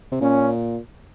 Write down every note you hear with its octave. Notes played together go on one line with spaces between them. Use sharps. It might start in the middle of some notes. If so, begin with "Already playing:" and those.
C3
A#2 C#4